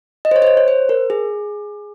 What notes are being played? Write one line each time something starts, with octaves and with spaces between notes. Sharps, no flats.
D#5
C5
C#5
C5
C#5
C#5
C5
A#4
G#4